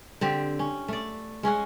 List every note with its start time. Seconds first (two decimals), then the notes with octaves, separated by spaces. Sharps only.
0.21 D3 C4 G4
0.59 C#4
0.88 A3 D5
1.43 G#3 C#4 G#4 F#5